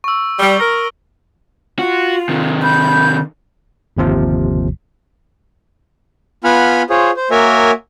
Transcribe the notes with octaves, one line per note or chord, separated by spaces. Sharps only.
C#6 E6
G3 G7
A#4
F4 F#4
C3 D#3
B5 G6
G1 D#2 C3 F3
B3 F4 F#5 G#5 B5 F6
F4 G#4 C5 C#5
C5
A#3 F#4 A#4 C#5 E5 G#5